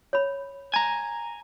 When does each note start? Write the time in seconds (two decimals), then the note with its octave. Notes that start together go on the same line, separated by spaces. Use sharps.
0.13 C#5 B5
0.74 G#5 A#5